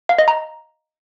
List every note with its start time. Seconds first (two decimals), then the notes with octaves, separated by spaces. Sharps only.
0.09 F5
0.18 D#5
0.28 A#5